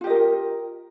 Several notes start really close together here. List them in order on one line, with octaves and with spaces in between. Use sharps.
F4 G4 D#5 A#4